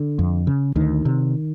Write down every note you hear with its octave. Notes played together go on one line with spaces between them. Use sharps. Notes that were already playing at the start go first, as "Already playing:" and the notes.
Already playing: D3
F2
C#3
D2 D#3
C3